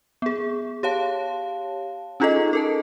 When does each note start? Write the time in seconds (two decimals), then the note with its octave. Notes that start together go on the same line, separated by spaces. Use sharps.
0.22 B3 G#4
0.83 G4 C#5 F5 A5
2.20 C#4 D#4 F4 G#4 A4 D#5
2.53 A4 A#4 A5